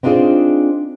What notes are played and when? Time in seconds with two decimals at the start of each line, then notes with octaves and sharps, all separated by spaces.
0.03 C4 D4 D#4 F4 G#4 C5